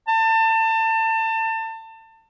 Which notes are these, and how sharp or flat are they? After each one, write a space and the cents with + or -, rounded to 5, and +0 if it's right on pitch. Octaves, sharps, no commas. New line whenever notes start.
A5 +30